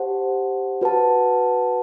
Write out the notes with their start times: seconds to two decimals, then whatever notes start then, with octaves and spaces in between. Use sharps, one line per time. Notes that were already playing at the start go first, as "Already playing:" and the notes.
Already playing: G4 C5 F#5 A5
0.81 F#4 B4 F#5 A5